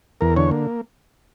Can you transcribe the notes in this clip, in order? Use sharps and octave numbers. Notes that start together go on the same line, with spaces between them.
E2 A#4
D3 C#5
A#3